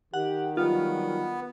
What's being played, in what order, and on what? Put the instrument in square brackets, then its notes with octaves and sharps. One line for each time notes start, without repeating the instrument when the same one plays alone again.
[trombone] D#3 [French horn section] G4 [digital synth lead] F#5
[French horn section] D2 F#3 G3 [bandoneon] B3 [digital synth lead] F4